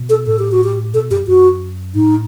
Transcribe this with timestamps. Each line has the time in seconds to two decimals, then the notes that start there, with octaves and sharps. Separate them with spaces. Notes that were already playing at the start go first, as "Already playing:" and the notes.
Already playing: B2
0.09 A4
0.26 A2 A4
0.39 G4
0.52 F#4
0.64 G4
0.94 B2 A4
1.10 F#2 G4
1.27 F#2 F#4
1.95 A2 D#4